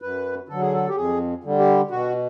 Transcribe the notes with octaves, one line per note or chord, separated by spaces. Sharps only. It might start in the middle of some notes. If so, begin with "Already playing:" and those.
F#2 B4
D3 F#3 A4
G#4
A4
G4
F2 G#4
D3 G3
G4
B2 F#4